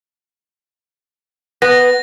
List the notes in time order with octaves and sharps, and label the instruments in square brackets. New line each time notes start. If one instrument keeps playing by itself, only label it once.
[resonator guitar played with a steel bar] B3 [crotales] A#6